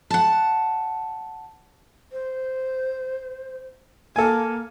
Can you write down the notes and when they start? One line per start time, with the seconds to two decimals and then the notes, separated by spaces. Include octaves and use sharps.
0.10 F#5 A5
2.12 C5
4.16 A#3 A4 G#5